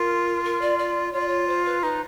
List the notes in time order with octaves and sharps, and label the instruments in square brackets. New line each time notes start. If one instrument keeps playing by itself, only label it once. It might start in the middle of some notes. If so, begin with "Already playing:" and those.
Already playing: [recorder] F4 [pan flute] A#4
[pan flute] A#4
D5
D5
[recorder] F4 [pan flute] C#5
[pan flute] D5
C#5
C5
B4
[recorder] D#4 [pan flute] B4